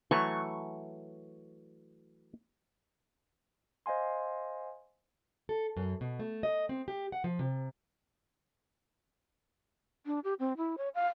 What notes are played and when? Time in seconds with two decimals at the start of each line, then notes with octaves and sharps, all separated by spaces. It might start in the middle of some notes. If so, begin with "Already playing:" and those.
0.11 E3 F#3 A3 C#6
3.86 C5 D#5 F5 G#5 C6
5.49 A4
5.77 F#2
6.01 B2
6.19 A3
6.43 D#5
6.69 C4
6.88 G4
7.12 F#5
7.24 F3
7.39 C3
10.06 D4
10.24 G4
10.39 C4
10.57 E4
10.78 C#5
10.95 F5